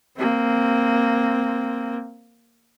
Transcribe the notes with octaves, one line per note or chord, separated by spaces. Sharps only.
A#3 C4